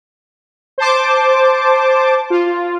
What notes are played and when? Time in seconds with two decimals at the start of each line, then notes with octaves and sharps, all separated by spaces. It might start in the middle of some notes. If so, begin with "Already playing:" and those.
0.78 C5 A5 D6
2.30 F4